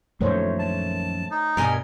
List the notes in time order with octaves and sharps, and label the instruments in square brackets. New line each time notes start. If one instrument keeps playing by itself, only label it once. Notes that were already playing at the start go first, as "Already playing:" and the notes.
[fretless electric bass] A#1 F#2 D#3 [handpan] A3 C5 C#5
[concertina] A5
D#4
[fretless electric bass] G2 B2 G3 [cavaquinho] A#4 D#5 G#5